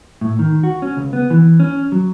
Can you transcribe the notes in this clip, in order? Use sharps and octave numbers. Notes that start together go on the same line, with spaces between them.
A2
D#3
F#4
C#4
C#2
B3
E3
C#4
F#3